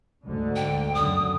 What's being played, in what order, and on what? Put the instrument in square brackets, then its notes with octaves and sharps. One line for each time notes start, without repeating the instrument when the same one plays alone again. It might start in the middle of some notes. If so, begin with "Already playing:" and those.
[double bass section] D2 G#2 D3
[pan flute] G5
[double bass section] F#2 D3 [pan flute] D#6